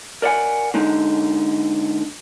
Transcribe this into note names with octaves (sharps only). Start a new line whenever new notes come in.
A#4 D5 D#5 F#5 G#5
D3 G#3 D#4